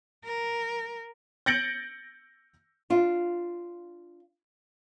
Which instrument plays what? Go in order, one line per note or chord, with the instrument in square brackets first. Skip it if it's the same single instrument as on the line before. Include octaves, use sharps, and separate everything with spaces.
[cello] A#4
[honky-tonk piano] G6 A6 A#6 C#7 D7 F#7
[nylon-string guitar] D4 F4